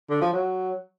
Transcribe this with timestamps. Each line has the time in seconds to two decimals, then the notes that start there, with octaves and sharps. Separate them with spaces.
0.10 D3
0.21 F3
0.33 F#3